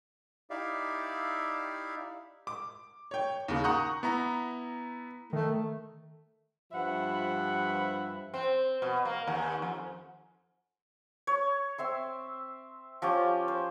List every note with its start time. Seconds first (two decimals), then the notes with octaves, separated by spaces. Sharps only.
0.50 D#4 E4 G4 D5 E5 F5
2.47 D6
3.11 C#5 G5
3.48 D#2 C#3
3.64 F#5 A#5 C#6 D#6 F#6 G6
4.03 B3 E4 A#5
5.33 D#3 A3
6.72 G2 F3 E5 F#5 B5
8.34 C4
8.82 B2
9.05 A#3
9.27 D#2
9.62 F2
11.27 C#5
11.78 C4 E5 C6
13.02 F3 C#4 G4
13.48 C5